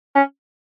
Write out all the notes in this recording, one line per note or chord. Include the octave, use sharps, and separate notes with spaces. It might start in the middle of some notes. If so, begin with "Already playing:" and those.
C#4